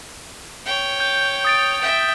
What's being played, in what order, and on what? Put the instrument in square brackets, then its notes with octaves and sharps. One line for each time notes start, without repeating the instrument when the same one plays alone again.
[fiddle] C#5 G5
[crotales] G6
D#6 A6 D7
[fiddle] E5 G5